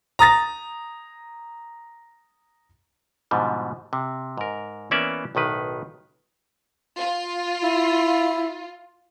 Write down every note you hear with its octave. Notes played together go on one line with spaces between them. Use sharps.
A#5 D#6 A6 A#6
G#2 B2 D3 F3 G3
C3
G#2 A#4
E3 A#3 B3 C#4 D5 E5
B1 A2 D#3 B4
F4
E4